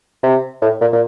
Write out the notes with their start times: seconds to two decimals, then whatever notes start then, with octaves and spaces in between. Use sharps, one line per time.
0.23 C3
0.62 A2
0.81 A#2
0.93 A#2